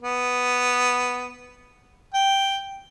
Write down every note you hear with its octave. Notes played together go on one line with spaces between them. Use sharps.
B3
G5